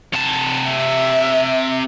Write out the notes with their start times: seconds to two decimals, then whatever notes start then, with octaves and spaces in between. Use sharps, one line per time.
0.13 C3 A5
0.70 E5